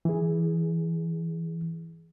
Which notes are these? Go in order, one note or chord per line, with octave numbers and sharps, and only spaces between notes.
E3 G#4